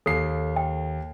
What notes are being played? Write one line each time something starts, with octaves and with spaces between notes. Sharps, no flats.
D#2 A4 C7
G5